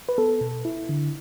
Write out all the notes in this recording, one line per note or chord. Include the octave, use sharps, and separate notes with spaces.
B4
B3 A4
B2
E4
D3